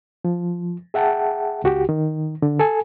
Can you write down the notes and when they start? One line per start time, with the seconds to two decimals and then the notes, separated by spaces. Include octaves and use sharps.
0.25 F3
0.94 G#4 E5 F#5 G5 A5
1.64 C#2 F#4 G4
1.89 D#3
2.42 D3
2.59 A4 G#5